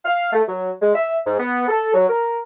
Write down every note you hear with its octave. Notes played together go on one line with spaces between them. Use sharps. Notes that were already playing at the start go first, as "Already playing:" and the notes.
F5
A3
F#3
G#3
E5
G#2
B3
A4
F#3
A#4